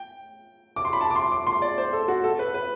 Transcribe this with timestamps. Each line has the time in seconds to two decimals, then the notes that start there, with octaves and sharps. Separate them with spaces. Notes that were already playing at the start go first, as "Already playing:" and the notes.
Already playing: G5
0.76 D6
0.85 C6
0.93 B5
1.01 A5
1.11 D6
1.16 C6
1.32 D6
1.47 C6
1.62 D5
1.78 C5
1.93 A4
2.08 F#4
2.24 A4
2.39 B4
2.54 B4